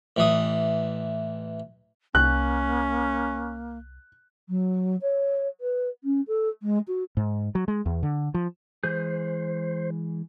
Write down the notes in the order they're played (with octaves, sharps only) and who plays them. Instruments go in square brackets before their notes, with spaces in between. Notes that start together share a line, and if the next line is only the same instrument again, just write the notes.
[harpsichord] A1 E3 D#6
[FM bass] C2 [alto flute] A#3 [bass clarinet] C#4 [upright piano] F#6
[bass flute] F#3
C#5
B4
C#4
A4
G#3
F#4
[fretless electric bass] G#2
F#3
G#3
E2
D3
F3
[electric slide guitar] E3 G#3 G#4 [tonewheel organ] C5